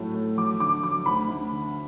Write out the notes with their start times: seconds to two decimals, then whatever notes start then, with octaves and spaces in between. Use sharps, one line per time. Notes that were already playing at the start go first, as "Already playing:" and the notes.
Already playing: A2 F#3 A3
0.14 A3
0.37 F#3 D6
0.60 D3 D6
0.83 F#3 D6
1.06 D2 B5
1.28 D2
1.51 D3